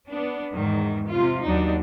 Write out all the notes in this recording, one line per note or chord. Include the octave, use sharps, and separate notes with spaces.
B3 D4
E2 G#2 D#3
C3 F4
D#2 F#3 D4 D#4